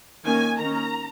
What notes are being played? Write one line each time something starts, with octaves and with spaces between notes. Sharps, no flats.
D#3 A#3 C#4 G#5
D#3 A#3 C#4 A#5